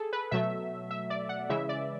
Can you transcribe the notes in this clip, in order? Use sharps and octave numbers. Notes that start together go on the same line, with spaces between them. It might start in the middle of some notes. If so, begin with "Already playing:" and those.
Already playing: G#4 A4
B4
B2 F#3 A3 E5
E5
D5
F#5
C#3 E3 G#3 E5
D5